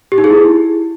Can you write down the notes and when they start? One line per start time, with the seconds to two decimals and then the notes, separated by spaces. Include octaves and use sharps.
0.12 G4
0.18 D#4
0.24 G#4
0.30 E4